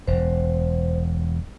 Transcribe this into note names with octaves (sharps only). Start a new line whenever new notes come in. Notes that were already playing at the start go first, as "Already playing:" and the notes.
E1 C5